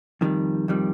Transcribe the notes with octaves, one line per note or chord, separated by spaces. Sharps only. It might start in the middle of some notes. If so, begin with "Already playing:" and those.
F2 D#3 G3
F2 D#3 G3